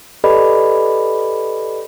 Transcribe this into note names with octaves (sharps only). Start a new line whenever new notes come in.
G4 A4 B4 D5 D#5 B5